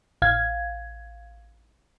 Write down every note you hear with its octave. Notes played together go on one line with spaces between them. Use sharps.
A1 F5 G#6